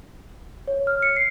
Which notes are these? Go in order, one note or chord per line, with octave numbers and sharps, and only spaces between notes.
C#5
F6
C#7
C7